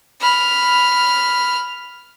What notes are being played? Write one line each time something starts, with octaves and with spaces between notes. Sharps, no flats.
B5 F6